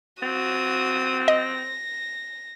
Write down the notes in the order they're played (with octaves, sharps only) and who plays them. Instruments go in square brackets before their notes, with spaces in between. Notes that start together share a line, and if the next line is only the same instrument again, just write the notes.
[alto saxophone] C4 [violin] F#4 D#6
[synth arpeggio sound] D#5 [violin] A#6